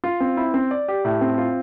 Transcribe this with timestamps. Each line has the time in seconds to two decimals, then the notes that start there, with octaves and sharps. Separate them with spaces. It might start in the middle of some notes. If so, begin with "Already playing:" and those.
0.04 F4
0.20 C4
0.37 E4
0.54 C4
0.71 D5
0.88 G4
1.05 A2
1.21 C4
1.38 F4